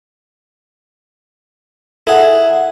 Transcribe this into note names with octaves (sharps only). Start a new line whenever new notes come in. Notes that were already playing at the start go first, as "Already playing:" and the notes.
E4 G#4 A4 F#5